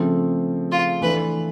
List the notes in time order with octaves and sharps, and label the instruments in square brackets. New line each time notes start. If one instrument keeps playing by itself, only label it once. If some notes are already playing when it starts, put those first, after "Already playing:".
Already playing: [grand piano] C#3 F3 A3 C4
[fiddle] F4
[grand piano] E3 A3 D4 [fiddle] B4